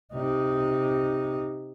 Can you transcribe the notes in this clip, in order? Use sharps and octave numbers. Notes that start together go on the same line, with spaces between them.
C3 D#4